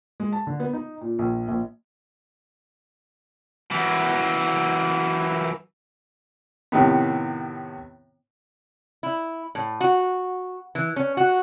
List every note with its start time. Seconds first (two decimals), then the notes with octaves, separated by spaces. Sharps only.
0.20 G#3
0.32 A5
0.47 D3
0.60 B3
0.73 D#4
1.01 A#2
1.19 A#1
1.48 A#1
3.71 F#2 E3
6.72 A2 C3 D#3 B3
9.03 E4
9.55 A2
9.81 F#4
10.75 E3
10.96 C#4
11.17 F#4